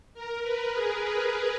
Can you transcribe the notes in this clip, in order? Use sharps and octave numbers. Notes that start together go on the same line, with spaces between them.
A#4
B4
G#4
B4